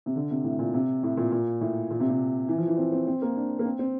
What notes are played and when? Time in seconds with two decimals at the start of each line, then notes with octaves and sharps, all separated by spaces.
0.06 C3
0.15 D3
0.31 C3
0.44 A2
0.59 A#2
0.74 C3
1.03 A2
1.17 A#2
1.32 A#2
1.61 A2
1.90 A#2
2.00 C3
2.10 C3
2.49 E3
2.58 F3
2.68 E3
2.77 C4
2.92 C4
3.07 C4
3.22 A#3
3.36 D4
3.59 A#3
3.65 C4
3.79 C4